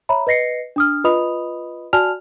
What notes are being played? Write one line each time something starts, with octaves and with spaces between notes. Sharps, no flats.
C#5 E5 A#5 B5
B4 D#5 A#6 C7 C#7
D4 D#6 F6
F4 B4 D#5 B5 D#6 F7
F#4 D5 G#5 A5 F6 F7